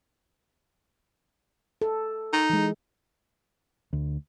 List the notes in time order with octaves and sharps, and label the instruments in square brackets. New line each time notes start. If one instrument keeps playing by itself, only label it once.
[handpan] A4
[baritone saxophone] D#4
[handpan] E3 G#3
[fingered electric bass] D2